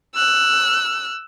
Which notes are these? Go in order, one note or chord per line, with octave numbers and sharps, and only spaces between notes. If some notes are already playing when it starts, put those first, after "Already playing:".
E6 F#6